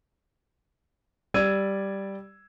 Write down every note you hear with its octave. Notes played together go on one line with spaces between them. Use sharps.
G3 D5 E6 G#6 D#7